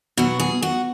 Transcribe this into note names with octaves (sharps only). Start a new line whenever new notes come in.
B2 F#3 F#4
G#4
F#4